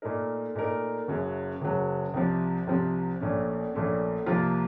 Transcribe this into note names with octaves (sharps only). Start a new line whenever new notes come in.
A#2 A3 D#4 A#4
A#2 A3 D#4 A#4
F#1 F#2 C#3 F#3
F#1 F#2 C#3 F#3
C2 C3 F3 C4
C2 C3 F3 C4
A#1 A#2 A3 C#4
A#1 A#2 A3 C#4
C2 C3 F3 A#3 F4